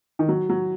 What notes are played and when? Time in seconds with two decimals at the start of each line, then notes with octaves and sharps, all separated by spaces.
0.19 D#3
0.29 F#3
0.49 F#3